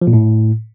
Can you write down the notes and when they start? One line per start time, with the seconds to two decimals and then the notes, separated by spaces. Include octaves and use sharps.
0.01 F3
0.07 A#2
0.13 A2